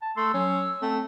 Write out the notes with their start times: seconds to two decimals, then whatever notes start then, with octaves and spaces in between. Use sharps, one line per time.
0.02 A5
0.17 A3 C6 E6
0.34 F#3 C#4
0.82 A3 C4